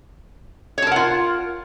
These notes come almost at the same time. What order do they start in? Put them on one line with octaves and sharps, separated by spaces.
C#5 A5 A#4 F#5 F4